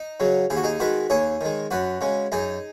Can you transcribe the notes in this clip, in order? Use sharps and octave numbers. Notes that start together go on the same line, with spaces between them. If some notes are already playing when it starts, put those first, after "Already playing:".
Already playing: D#4
C#3 F#3
D#2 G#4
F#4
D#4 G#4
D#3 G#3 F#4 B4
D#2 G#4 C#5
D#3 G#3
F#2 F#4 B4
C#3 G#3
F#2 D#4 G#4